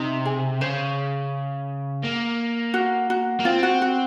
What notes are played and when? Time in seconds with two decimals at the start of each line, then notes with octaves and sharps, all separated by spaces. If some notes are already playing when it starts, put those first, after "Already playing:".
Already playing: C3 D#4
0.25 G#4
0.61 C#3 C5
2.04 A#3
2.74 F#4
3.10 F#4
3.40 A#3
3.45 C4 F4
3.63 F#4
3.82 F#4